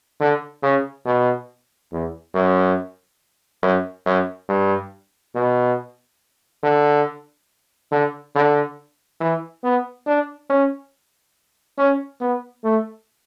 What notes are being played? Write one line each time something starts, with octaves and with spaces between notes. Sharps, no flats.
D3
C#3
B2
E2
F#2
F#2
F#2
G2
B2
D3
D3
D3
E3
B3
D4
C#4
C#4
B3
A3